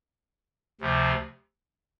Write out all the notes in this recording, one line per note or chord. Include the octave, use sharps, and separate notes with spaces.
D2 C3 F3